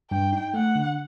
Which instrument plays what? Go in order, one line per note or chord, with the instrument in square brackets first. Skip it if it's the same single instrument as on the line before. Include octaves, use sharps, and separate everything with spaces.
[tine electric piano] G2 [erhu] G5
[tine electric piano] D#4
[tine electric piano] A3 [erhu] F#5
[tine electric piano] D3